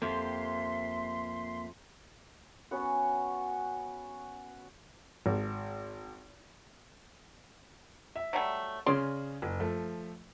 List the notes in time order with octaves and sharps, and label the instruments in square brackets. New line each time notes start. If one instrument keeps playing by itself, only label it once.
[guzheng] F2 [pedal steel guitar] A#3 G4 G5 [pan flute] E5 [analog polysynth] C6
[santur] B3 C#4 F#4
[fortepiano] G#1
[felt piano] E5
[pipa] F#3 G3 A3
[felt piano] C#3 C#4 G#4 [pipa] D5 C6
[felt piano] F#1
F3 A3